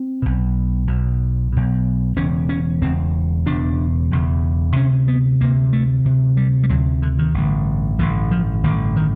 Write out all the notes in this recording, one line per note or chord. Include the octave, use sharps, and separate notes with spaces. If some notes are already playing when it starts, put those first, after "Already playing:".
Already playing: C4
B1 B2
B1 B2
B1 B2
E1 E2 C#3 C#4
C#4
E1 E2 C#3 C4
E1 E2 C#3 D4
E1 E2 C#3
D2 C3 C#4
B3
D2 C3 A#3
A3
D2 C3
G3
G3
D2 C3 F#3
D3
D#3
A1 G2 D3
A1 G2 D3 E3
F3
A1 G2 D3 D#3
D#3